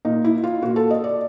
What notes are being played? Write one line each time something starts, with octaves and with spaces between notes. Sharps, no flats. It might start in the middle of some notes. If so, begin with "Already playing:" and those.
A#2 D#4
E4
F4
A#2 F#4
A4
D#5
D5